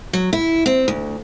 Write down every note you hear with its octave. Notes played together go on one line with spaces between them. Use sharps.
F#3
E4
C4
D2